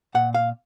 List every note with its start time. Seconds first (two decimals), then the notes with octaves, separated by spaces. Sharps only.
0.15 A#2 F#5
0.34 F5